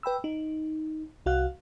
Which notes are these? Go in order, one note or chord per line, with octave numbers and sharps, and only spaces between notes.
B4 G5 B5 E6
D#4
C2 F#4 F5 F#6